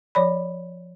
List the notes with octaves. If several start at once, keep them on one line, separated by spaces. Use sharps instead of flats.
F3 C#5 D5 B5